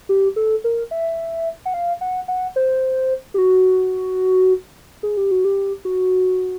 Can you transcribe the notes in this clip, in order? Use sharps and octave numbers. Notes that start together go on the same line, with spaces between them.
G4
A4
A#4
E5
F#5
F5
F#5
F#5
C5
G4
F#4
G#4
G4
F#4
G4
F#4